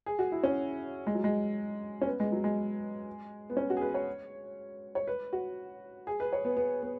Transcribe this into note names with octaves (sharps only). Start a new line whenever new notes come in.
G#4
F#4
E4
C#4
G#3
F#3
G#3
C#4
B3
G#3
F#3
G#3
B3
C#4
F#4
G#4
B4
C#5
C#5
B4
F#4
G#4
B4
C#5
B3
B3
B3